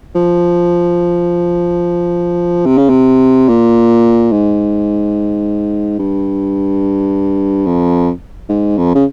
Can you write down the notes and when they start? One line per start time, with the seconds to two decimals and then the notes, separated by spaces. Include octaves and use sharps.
0.15 F3
2.66 C3
2.78 C#3
2.90 C3
3.48 A#2
4.32 G#2
5.99 G2
7.66 F2
8.49 G#2
8.78 F2
8.95 C#3